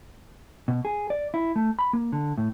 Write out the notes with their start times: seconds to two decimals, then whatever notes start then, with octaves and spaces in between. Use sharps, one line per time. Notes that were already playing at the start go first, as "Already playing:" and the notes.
0.68 B2
0.85 G#4
1.10 D5
1.34 E4
1.56 A3
1.79 B5
1.93 A#3
2.13 D3
2.38 A2